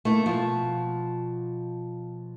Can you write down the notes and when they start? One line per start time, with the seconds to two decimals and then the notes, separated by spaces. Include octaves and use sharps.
0.05 A3 A#3 E4
0.26 B2 F3